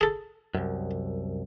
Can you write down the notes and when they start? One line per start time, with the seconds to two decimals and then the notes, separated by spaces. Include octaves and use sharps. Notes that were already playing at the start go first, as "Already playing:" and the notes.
0.01 G#4 A4
0.55 C2 F#2